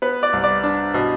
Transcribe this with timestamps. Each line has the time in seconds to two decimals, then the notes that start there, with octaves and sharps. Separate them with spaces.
0.02 B3 B4
0.23 D5
0.33 C2
0.44 D5
0.64 D4
0.94 B2